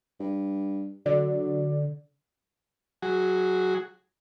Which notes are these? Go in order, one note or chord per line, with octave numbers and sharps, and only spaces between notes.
G2
D3 F#3 D5
F#3 F#4 G#4